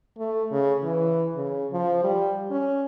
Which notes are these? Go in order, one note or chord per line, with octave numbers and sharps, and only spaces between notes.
A3
C#3
E3
C#3
F3
G3
C#4